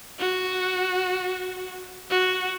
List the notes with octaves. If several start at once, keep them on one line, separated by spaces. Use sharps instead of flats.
F#4
F#4